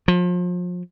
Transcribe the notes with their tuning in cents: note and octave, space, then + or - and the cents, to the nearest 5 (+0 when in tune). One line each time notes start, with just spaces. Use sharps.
F3 +35